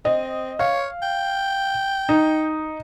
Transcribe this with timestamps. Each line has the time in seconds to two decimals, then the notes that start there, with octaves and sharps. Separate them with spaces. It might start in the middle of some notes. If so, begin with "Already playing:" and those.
0.05 C4 D#5
0.59 C#5 F5
1.02 G5
2.09 D#4